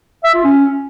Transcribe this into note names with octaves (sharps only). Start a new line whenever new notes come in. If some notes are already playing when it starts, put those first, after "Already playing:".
E5
F4
C#4